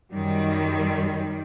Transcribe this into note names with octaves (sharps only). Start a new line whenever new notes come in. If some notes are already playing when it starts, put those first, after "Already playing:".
F#2 D#3 G3